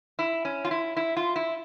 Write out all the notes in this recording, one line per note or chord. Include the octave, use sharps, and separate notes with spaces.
E4
C#4
F4
E4
E4
F4
E4